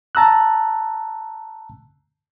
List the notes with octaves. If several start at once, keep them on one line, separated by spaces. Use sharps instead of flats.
A5 A#5 E6 F#6